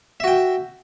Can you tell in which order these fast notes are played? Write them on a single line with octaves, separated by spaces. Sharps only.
E5 F#4 G5